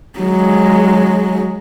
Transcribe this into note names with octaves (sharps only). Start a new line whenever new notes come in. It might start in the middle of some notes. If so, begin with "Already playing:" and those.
F#3 G#3